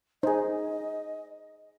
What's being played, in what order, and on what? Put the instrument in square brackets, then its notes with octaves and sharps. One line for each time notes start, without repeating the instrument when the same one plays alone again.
[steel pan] D#4 G#4 [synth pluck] C5 G#5 [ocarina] D#5